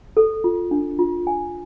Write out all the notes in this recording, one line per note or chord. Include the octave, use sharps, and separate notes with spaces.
A4
F4
D4
F4
G#5